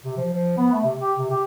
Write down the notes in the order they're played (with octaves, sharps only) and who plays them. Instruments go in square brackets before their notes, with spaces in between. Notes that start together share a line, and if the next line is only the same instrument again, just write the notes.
[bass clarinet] C3
F3
F3
B3
A3
C3
G4
C3
G4